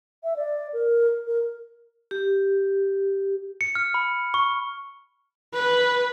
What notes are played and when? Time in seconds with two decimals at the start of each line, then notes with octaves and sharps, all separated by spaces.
0.24 E5
0.36 D5
0.73 A#4
1.27 A#4
2.11 G4
3.61 C#7
3.75 F6
3.94 B5
4.34 C#6
5.53 B4